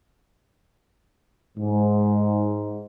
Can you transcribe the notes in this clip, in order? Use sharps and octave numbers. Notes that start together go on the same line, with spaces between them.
G#2